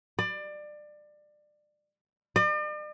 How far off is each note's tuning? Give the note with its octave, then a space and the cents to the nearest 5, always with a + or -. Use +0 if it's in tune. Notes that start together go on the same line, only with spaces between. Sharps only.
D5 +25
D5 +45